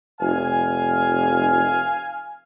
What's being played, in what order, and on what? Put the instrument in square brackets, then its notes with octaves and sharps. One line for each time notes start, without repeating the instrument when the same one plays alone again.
[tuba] F1 [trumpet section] F5 G#5